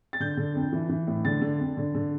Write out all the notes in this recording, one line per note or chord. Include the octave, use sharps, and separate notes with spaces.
A6
D3 G6
D3
F2
E3
E3
A2
D3 A6
D3
F2
D3
D3